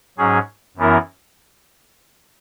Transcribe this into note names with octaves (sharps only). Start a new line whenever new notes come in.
G#2 F#3 C#4 G#4
F#2 E3 B3 E4 A#4